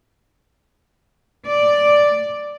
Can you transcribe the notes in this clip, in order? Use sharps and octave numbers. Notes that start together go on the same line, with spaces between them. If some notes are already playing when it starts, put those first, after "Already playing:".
D5